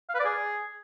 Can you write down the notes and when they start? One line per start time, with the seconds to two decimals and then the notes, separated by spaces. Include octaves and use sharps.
0.09 F5
0.14 B4
0.20 D5
0.25 G#4